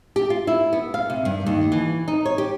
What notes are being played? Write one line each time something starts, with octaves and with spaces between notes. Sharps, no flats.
G4
F4
E4
B3
F5
C3
G2
D#2
E3
D#4
C#5
G4